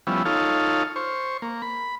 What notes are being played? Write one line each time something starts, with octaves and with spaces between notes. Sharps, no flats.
F3 G3 B3 C#4 E4
D#4 F4 A4 C#5 F5
C5 C#6
A#3
B5